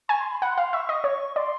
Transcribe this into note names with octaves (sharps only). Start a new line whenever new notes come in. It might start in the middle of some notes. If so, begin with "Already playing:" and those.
G#5 C#6
C6
B5
F#5 B5
C6
F5
C6
E5 C#6
D#5
C#5
D5 C6